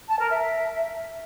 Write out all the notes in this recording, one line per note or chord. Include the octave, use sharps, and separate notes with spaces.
A5
A#4
E5